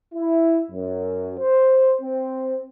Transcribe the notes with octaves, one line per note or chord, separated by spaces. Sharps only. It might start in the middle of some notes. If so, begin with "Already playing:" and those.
E4
F#2
C5
C4